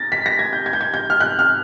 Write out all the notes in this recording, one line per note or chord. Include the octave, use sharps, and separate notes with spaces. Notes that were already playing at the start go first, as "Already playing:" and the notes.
Already playing: A6 A#6
B6
A#6
G#6
G6
G#6
G6
G#6
G6
F6
F#6
F6